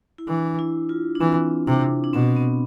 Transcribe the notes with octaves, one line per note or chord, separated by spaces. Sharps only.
E4
E3 D4
E4
F4
D4
E3 C4
C3 D4
D4
B2 C4
B3